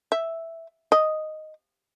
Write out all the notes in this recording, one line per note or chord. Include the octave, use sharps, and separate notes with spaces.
E5
D#5